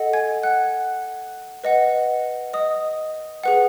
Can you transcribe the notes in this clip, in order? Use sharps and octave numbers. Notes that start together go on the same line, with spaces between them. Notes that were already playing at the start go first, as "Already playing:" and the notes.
Already playing: A4 D#5 F#5
G#5 G#6
F#5 F#6
B4 D#5 F#5
D#5 D#6
G#4 B4 F#5